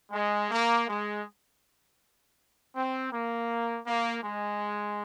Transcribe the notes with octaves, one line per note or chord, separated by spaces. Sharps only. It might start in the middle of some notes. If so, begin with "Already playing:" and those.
G#3
A#3
G#3
C4
A#3
A#3
G#3